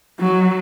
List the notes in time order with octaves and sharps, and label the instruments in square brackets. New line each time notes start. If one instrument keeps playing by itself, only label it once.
[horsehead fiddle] F#3